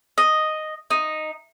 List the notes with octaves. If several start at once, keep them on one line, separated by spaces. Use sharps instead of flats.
D#5
D#4